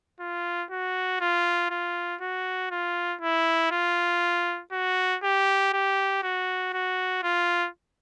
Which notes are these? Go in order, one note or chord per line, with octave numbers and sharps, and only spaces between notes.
F4
F#4
F4
F4
F#4
F4
E4
F4
F#4
G4
G4
F#4
F#4
F4